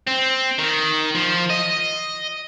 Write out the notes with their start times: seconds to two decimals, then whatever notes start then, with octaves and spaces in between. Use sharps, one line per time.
0.07 C4
0.58 D#3
1.15 F3
1.50 D#5